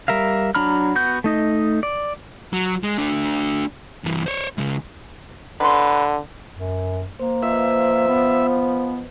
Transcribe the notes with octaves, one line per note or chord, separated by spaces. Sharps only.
G3 A#4 E5 F5
F#3 D4 A#5 B5 F6
B3 F#4 G6
A3 D#4 D#5
D5
F#3
G#3
A3 D4
G2 E3
C5 C#5
C#3 G#3
D3 B4 C6
F#2
A#3 C5
F3 B4 C5 D#5 E5
B3